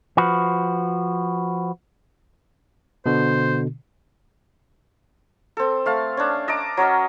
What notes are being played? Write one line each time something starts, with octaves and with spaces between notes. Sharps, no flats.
F3 F#4 B4
B2 D3 C5
C4 A4
A3 F5 A5
C#4 D4
D#5 A5 A#5 D6
F#3 C#4 A#4 D#5